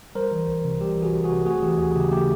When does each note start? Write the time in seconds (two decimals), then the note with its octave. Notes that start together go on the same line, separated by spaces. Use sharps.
0.15 G3 A#4 C5
0.32 E3
0.47 C2
0.64 C3
0.81 G3 G4
0.97 E3
1.02 F#4 G#4
1.14 C2
1.24 F#4 G#4
1.30 C3
1.46 A3 F#4 G#4
1.62 E3 G4
1.78 D#2 F#4 G#4
1.95 C#3 G4
2.11 A3 G4